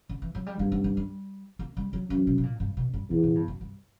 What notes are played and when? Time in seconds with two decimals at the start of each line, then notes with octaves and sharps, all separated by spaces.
0.09 D3
0.22 E3
0.35 F#3
0.46 G3
0.59 G2 A#3
0.72 B3
0.84 A#3
0.97 G3
1.59 A#3
1.77 G3
1.93 F#3
2.10 F#2 E3
2.27 B2
2.38 B2
2.43 A#2
2.60 G2
2.77 B2
2.93 G2
3.10 E2 A#2
3.23 A#2
3.35 G2
3.48 F#2
3.61 G2